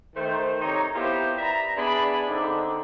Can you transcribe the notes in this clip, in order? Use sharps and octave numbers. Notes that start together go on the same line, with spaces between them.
D#3 A3 C5
C3 D#3 D#4 C#5 A#5
B3 E4 F4 G4 A#4 C5
B4 D5 E5 A#5
B3 D4 E4 G#4 D5 B5
D3 C4 D4 D#4